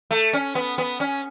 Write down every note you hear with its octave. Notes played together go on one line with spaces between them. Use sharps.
A3
C#4
B3
B3
C#4